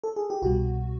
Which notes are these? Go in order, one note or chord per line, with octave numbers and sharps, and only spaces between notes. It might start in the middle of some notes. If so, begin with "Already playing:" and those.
A4
G#4
G4
C2 B2 G3 F#4